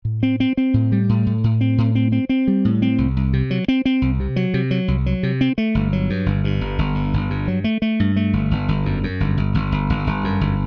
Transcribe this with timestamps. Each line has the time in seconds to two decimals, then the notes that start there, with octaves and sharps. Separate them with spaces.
0.05 A2
0.23 C4
0.40 C4
0.57 C4
0.74 A2
0.92 G3
1.09 A2
1.27 A2
1.44 A2
1.61 C4
1.78 A2
1.95 C4
2.12 C4
2.29 C4
2.48 G3
2.65 A2
2.82 C4
2.98 C2
3.17 C2
3.33 C3
3.51 F#3
3.68 C4
3.85 C4
4.02 C2
4.20 C3
4.36 F#3
4.54 C3
4.71 F#3
4.88 C2
5.06 F#3
5.23 C3
5.41 C4
5.58 A3
5.75 G1
5.93 F#3
6.10 G2
6.26 G1
6.44 G2
6.61 G1
6.78 G1
6.95 G2
7.13 G1
7.30 G2
7.48 F#3
7.64 A3
7.82 A3
8.00 G2
8.16 A3
8.33 G1
8.51 G1
8.68 G1
8.86 F#2
9.03 F#2
9.20 G1
9.37 G1
9.54 G1
9.72 G1
9.90 G1
10.07 G1
10.24 F#2
10.41 G1